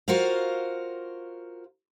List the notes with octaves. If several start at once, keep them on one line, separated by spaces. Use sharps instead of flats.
F4 F#4 A#4 C5 F5